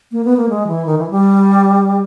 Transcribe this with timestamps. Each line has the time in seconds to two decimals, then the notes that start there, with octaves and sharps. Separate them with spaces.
0.12 A#3
0.25 B3
0.37 A#3
0.49 G#3
0.68 E3
0.86 D#3
0.98 E3
1.10 G3